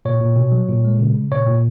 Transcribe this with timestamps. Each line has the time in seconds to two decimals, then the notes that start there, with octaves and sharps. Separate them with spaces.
0.05 A#2 C#5
0.21 A#2
0.36 B2
0.52 F#3
0.68 A#2
0.85 G#3
1.00 C#3
1.15 C#3
1.32 A#2 C#5
1.47 A#2